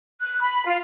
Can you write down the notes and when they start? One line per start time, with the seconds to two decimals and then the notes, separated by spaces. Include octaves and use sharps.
0.20 F#6
0.40 B5
0.67 F4